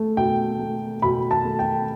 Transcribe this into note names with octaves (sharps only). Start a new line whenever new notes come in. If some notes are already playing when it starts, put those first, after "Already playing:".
Already playing: A3
B2 G5
A3
B2 B5
A5
A3
G5